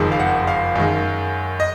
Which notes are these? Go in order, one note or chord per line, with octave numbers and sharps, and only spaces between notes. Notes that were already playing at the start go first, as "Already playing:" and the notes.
Already playing: F#1 F2 D#3 G#3
F5
F#5
F5
F#2 D#3 G#3
D#5